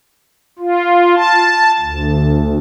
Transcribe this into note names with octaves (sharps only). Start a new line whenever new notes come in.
F4
A5
D2